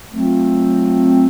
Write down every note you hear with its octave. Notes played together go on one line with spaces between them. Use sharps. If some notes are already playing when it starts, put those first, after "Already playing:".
F#3 A3 C4 F4